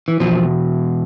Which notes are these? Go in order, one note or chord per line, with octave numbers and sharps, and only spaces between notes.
E3
E2 B2 F3